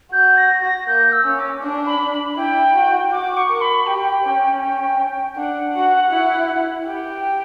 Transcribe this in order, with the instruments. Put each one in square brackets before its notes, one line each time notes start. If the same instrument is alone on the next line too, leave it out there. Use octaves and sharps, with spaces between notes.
[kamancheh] F#4 [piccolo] G6
[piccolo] A#6
A#6
[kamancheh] A#3 [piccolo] G6
[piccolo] E6
[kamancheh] C#4
[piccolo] D6
[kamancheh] D4
[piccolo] B5
B5
[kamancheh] E4 [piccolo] G5
[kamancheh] F#4
[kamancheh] F#4 [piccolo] D6
[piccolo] C#6
[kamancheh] A#4
[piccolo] B5
[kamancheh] G4 [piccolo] G5
[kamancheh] C#4
[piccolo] G5
[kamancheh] D4 [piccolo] F#5
[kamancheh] F#4
E4
[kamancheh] G4 [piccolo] G5